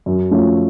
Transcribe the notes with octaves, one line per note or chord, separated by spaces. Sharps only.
F#2
F3 A3 C#4 F4